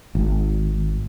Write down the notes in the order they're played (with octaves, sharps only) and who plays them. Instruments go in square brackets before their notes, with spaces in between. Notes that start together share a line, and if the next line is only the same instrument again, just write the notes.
[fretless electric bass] G#1